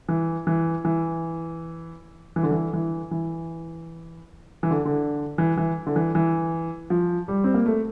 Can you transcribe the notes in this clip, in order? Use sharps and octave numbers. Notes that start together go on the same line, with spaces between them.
E3
E3
E3
E3
D3
E3
E3
E3
E3
D3
D3
E3
E3
D3
E3
E3
F3
G3
C4
A#3
A3